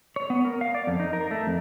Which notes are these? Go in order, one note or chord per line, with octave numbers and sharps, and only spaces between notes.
C#5
B3
A#4
F5
D5
F2
D#4
A#4
A3
F2